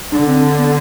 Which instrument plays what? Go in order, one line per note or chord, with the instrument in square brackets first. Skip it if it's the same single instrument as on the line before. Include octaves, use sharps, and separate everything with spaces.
[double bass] D3 [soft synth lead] D4
[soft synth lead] C4
B3